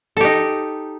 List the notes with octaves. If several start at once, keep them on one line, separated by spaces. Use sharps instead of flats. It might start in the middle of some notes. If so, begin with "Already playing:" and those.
D#4 G4 A4